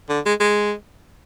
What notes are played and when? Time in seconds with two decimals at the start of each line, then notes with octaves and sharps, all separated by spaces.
0.09 D3
0.26 G#3
0.40 G#3